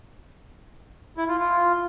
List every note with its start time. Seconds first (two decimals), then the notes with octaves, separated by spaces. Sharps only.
1.17 E4
1.28 F4
1.39 F4